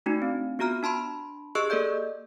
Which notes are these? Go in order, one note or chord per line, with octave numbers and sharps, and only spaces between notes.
A3 D4 D#4 F#4
C4
B3 F4 F#4 A#5 F6
D4 A5 B5 C6
G4 G#4 D#5 C#6 E6 F#6
A#3 A4 D5 D#5 G6